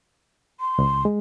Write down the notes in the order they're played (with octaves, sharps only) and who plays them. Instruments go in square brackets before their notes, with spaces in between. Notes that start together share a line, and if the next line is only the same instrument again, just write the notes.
[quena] C6
[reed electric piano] C#2
G#3